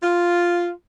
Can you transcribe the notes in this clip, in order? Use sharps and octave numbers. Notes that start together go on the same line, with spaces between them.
F4